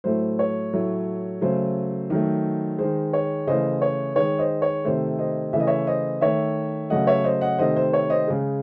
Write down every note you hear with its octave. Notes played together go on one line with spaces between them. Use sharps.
A2 F#3 A3 C5
C#5
A2 F#3 A3
C#3 F#3 A3 C5
D#3 F#3 A3
D#3 G#3 C5
C#5
C#3 E3 A3 C5 D#5
C#5
D#3 G#3 C#5
C5 D#5
C#5
C3 D#3 A3 C5
C5 D#5
C#3 E3 A3 E5
D#5
C#5 E5
C5 D#5
D#3 A3 C#5 E5
C#3 F#3 A3 D#5 F#5
C#5 E5
C5 D#5
D#5 F#5
C3 D#3 A3 C5 D#5
C5
C#5
C5 D#5
C#3 G#3